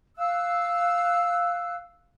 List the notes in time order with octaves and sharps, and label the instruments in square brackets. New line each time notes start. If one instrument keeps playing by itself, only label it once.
[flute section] F5 E6 F#6